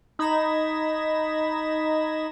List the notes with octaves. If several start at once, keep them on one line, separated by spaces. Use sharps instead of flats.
D#4 B5 G#6 A#6 E7